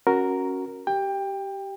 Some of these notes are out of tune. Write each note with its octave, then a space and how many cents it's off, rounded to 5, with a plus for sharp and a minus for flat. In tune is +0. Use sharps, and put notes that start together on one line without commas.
C#4 -15 F#4 +0 A#4 +0
G4 -15 G5 +20